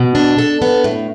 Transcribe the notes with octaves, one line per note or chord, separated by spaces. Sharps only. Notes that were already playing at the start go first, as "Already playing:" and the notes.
Already playing: B2
D4
A4
B3
A2